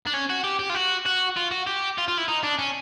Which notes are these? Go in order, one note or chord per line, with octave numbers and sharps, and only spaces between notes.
D4
C#4
F#4
G4
G4
F4
F#4
F#4
F4
F#4
G4
F4
F4
E4
D#4
D4
C#4